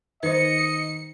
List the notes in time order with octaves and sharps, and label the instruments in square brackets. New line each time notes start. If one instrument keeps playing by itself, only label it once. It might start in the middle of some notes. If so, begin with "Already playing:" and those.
[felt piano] D#3 [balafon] B4 C5 [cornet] D#5 [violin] C#7